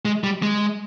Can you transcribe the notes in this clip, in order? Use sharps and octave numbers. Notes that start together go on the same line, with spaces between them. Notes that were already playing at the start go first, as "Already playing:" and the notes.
G#3
G3
G#3